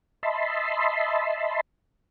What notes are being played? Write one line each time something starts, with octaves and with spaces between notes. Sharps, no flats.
D#5 E5 A5 B5 C6